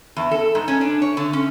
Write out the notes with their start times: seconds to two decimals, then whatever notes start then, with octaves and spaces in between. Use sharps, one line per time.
0.16 E2
0.31 A4
0.55 G#2
0.68 C#4
0.81 D4
1.02 C#5
1.17 D3
1.33 C#4